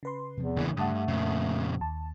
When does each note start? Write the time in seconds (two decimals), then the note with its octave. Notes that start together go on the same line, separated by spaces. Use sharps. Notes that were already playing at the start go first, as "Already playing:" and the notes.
0.03 C#3 B4 C6
0.37 E2 C3 F3
0.56 D1 C#2 C#3 E3 A#3 D4
0.77 G2 A3 F#5 A5 D#6
1.08 F2 A#2 C#3
1.81 D#2 A5